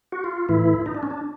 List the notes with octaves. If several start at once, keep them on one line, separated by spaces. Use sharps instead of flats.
F#4
F4
A2 E3 E4
D#4
D4
C#4
D4